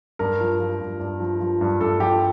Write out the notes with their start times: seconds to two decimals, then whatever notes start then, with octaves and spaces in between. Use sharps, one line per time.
0.19 G2 A#4
0.41 F3
0.60 F3
0.80 G2
1.00 G2
1.20 F3
1.40 F3
1.61 G2
1.81 G2 A4
2.00 F3 G4